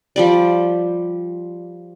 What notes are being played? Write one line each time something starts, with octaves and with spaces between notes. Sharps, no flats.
F3 G3 D5